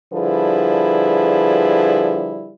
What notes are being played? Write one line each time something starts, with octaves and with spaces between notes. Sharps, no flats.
D3 F3 G3 E4 G#4 B4